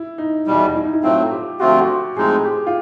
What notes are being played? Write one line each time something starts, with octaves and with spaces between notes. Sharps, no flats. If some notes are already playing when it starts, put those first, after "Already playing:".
Already playing: E4
D#4
E2 B2 G3
E4
D#4
E4
A2 F#3 A3 C4 F4
G4
D3 F3 A3 C4 F4 F#4
G4
F#4
A2 F3 G#3 C4 D#4 G#4
G4
F4